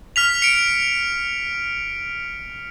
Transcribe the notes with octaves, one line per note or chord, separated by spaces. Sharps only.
F6 B6 F7
C#7 D7